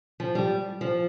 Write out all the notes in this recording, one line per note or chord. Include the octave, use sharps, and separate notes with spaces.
F3
G3
F3